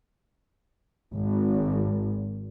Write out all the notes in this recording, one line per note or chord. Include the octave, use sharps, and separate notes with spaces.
G#1